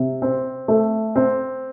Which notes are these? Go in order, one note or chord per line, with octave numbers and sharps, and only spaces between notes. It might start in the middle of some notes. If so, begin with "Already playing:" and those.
Already playing: C3
C4
A3
C4